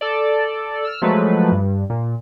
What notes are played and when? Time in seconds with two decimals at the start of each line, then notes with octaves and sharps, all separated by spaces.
0.01 A4 D5
0.85 E6 F6
1.02 F3 F#3 G#3 A3 B4
1.52 G2
1.90 A#2